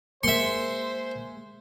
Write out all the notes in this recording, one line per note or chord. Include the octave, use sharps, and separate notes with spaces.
G#3 A#3 C5 E5 C6 C#7